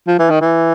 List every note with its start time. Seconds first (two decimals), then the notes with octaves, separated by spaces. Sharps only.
0.07 F3
0.19 E3
0.30 D#3
0.41 E3